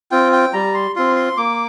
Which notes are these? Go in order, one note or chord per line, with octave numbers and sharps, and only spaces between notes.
C4 F4 G5
G5
G3 A#5
C6
C4 F4 C6
C6
A#3 D6